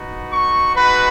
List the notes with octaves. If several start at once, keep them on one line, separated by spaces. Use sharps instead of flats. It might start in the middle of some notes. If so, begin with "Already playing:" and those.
Already playing: B3 D#4 F#4
C#6
G#3 B3 D#4 F#4 B4